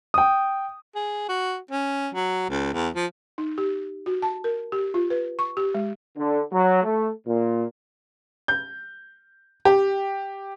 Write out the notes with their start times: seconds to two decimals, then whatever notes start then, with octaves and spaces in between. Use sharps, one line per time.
0.14 G5 D#6
0.96 G#4
1.29 F#4
1.71 C#4
2.15 F#3
2.50 C#2
2.74 E2
2.96 F3
3.38 D#4
3.58 G4
4.06 F#4
4.22 A5
4.44 A#4
4.72 G4
4.94 F4
5.10 B4
5.39 C#6
5.57 G4
5.75 G#3
6.17 D3
6.52 F#3
6.84 A3
7.27 A#2
8.48 G6
9.65 G4